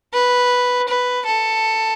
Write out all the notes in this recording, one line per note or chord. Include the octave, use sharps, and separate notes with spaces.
B4
B4
A4